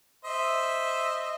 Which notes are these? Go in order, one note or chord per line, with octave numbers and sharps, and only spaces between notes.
C5 D#5 E5